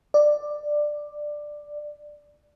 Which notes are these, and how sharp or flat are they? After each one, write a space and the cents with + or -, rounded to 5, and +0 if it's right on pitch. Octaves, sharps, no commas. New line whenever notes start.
D5 +10